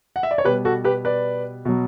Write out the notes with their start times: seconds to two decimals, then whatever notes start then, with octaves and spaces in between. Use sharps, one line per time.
0.16 F#5
0.23 E5
0.31 D5
0.38 C#5
0.45 B2 G4 B4
0.48 G3
0.65 F#4 A4
0.84 G4 B4
1.05 B4 D5
1.65 B2 F#3